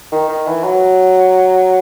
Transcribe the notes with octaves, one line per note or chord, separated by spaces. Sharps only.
D#3
D#3
E3
F#3